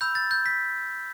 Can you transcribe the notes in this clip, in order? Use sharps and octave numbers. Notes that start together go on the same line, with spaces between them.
B5 E6 G6
A6
G6
B6